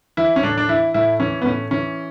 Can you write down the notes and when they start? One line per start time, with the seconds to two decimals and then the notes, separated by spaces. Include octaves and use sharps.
0.17 E3 E4
0.36 C#4
0.43 A2 D4
0.58 D4
0.69 E3 E4
0.94 A2 E4
1.20 E3 C#4
1.42 B3
1.46 A2 C#4
1.71 E3 C#4